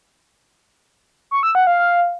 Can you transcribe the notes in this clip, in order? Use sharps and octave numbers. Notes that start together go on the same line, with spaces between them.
C#6
E6
F#5
F5
F5